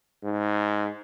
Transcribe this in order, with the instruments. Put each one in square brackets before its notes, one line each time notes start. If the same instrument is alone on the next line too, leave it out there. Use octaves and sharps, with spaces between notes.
[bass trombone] G#2